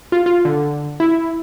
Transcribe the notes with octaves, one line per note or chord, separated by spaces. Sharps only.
F4
F4
D3
E4